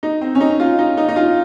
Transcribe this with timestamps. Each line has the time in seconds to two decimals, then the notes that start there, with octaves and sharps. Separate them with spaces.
0.03 D#4
0.21 C4
0.35 C#4
0.41 D#4
0.60 F4
0.79 D#4
0.97 D#4
1.09 D#4
1.16 F4